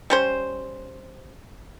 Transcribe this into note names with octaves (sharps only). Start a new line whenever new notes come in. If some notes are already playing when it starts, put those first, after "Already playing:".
G3 C#4 C5